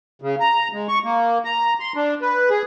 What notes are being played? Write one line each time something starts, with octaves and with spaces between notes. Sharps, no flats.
C#3
A#5
G#3
C#6
A#3
A#5
C6
D4
B4
G#4